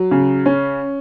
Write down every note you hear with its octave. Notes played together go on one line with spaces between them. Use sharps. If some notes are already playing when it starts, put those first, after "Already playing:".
Already playing: F#3
C#3
C#4